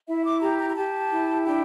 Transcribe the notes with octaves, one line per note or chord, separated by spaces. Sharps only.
E4 E5
D6
G4 A#5
A#5
A#5
G4 A5
E4
D4 G5